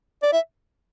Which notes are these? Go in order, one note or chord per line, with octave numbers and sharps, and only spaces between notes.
D5
E5